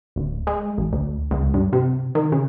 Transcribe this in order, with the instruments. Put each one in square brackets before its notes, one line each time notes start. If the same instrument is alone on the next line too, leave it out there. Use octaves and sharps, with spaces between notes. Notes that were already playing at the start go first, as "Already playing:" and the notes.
[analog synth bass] D1
G#3
A1
D2
C#2
G2
C3
D#3
C#3